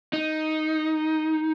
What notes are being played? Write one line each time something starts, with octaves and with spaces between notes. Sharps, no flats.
D#4